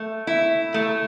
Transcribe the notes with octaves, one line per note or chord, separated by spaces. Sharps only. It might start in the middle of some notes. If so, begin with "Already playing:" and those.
Already playing: A3
E4
A3